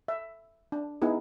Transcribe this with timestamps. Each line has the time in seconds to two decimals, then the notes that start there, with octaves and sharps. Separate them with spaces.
0.08 E5
0.72 D4
1.02 B3 D#4 E4 G#4